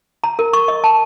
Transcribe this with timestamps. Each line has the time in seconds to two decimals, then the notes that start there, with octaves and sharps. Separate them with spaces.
0.24 A#5
0.39 A#4
0.53 C#6
0.68 D#5
0.84 A5